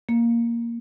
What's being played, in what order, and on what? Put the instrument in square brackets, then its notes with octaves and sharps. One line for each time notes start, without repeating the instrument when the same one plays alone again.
[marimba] A#3